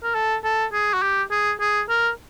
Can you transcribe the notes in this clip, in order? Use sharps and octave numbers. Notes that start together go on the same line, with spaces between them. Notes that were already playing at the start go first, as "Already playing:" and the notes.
A#4
A4
A4
G#4
F#4
G4
G#4
G#4
A#4